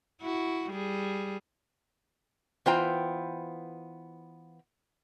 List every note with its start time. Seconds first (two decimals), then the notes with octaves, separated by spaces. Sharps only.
0.21 E4 F#4
0.71 G3 G#4
2.66 E3 B3 F4 C5 G5 A#5